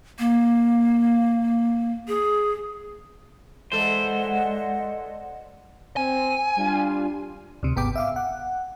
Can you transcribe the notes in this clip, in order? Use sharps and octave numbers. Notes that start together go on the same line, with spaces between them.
A#3
G#4
E3 G#3 A4 C5 D5 D#5 F#5
C4 G#5
G3 D4 F4
D2 C3
G#1 B3 G5 D6
E5 F5 D6
F#5